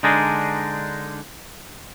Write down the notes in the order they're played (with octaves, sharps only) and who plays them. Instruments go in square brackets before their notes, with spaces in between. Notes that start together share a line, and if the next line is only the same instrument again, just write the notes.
[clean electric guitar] D3 G#3 D4 D#4 G#4 A#4